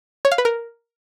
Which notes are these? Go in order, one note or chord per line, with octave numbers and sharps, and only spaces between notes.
C#5
F5
B4
A#4